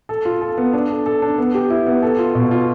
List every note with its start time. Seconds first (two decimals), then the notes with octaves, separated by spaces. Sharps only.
0.09 A4
0.25 F4
0.41 A4
0.58 B3
0.73 D4
0.90 A4
1.06 A4
1.22 D4
1.38 B3
1.54 G4
1.70 E4
1.87 B3
2.03 A4
2.19 F4
2.35 B2
2.51 F4